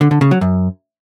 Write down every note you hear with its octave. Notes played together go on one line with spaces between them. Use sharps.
D3
D3
C#3
F#3
F#2